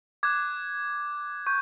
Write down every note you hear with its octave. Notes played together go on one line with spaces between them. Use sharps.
D6 F#6 G#6
C#6 G6